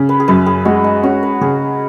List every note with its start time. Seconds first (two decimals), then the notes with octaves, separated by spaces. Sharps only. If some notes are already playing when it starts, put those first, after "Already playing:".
Already playing: C#3
0.09 B4
0.20 G#4
0.28 F#2 B4
0.46 G#4
0.65 G#3 F#4
0.84 D#4
1.03 C#4 F#4
1.23 B4
1.41 C#3 G#4